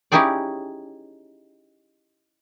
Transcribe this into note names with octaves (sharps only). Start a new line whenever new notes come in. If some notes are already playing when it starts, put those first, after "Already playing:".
C#4 D#4 E4 G4 G#4 D5